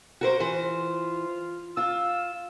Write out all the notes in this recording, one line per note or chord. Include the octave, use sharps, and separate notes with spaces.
F#4 A#4 C5
E3 F4 C5
F4 E6